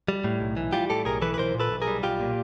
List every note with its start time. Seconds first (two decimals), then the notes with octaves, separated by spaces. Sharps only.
0.08 G3
0.24 A2
0.41 B1
0.57 E3
0.73 G3 F4 G4
0.90 A2 G4 A4
1.05 B1 G#4 A#4
1.21 E3 A4 B4
1.34 B4
1.38 B1 A#4 C5
1.54 A#2
1.60 A4 B4
1.71 B1
1.82 G#4 A#4
1.87 G3
2.03 B1 F4 G4
2.20 A#2